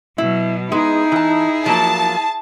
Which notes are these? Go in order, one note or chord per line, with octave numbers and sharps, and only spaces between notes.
B2 F#3 E4
G#3 B3 D#4 E4 G#4
E3 A5
F3 F#3 A#3 A5